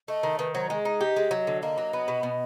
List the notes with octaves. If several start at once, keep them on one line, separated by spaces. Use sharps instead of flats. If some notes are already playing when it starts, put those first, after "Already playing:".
A3 D#5
D#3
D#3 B4
F#3 C5
G#3 D#5
D#4
G4
G#3
F#3
D3
A#3 D#5
F#3
B3
B2
B2